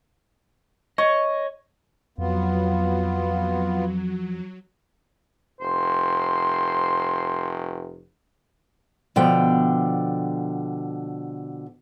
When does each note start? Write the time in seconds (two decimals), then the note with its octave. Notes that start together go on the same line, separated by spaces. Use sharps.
0.98 C#5 D#5
2.18 F2 F#3 B3 F4
5.61 F1 C5
9.16 B2 D3 F3 G5